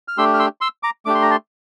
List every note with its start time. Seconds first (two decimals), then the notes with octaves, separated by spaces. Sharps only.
0.08 F6
0.17 A3 D4 G4 C6 E6
0.34 F6
0.39 C6 E6
0.61 C6 E6
0.83 A#5 D6
1.06 A3 D4 G4 D6
1.15 C6
1.22 A#5
1.30 A5 C6